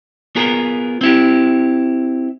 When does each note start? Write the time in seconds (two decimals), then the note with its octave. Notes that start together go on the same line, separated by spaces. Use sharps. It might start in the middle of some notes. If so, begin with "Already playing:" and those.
0.36 B3 F4 G#4 A#4
1.01 C4 E4 G4